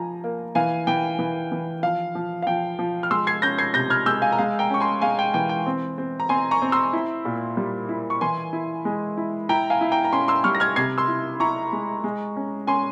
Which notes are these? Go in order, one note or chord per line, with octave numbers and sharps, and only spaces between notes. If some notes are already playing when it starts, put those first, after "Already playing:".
Already playing: F3 G#5 A#5
A#3
E3 F5 G#5
E3 G5
E3
E3
F3 F5
F3
F5
F3 G5
F3
F6
G#3 C6 E6
G#6 C7
C#4 G6 A#6
G#6 C7
C3 G6 A#6
F6 G#6
G#3 E6 G6
F5 G#5
A#5
G#3 F5 G#5
G5 A#5
C#4 C#6
G#5 C6
G#3 F5 G#5
G5
E3 G5
G5
C4
C4
A#5
C4 G#5 C6
A#5 C#6
C4
C6 E6
E4
A#2
G3
E4
C#6
E3 G#5 C6
E4
G#3
E4
E4 G5 A#5
F5 G#5
E4
G5 A#5
A#5
C#4 G#5 C6
C6 E6
G3 C#6 F6
A#6
F6 G#6
C3 G#6 C7
C6 E6
E4
E4 A#5 C#6
G#3
G#3
C#4
C#4 G#5 C6